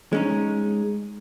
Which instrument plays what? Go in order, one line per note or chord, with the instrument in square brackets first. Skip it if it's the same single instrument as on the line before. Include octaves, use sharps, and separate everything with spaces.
[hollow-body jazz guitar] G#3 C#4 D#4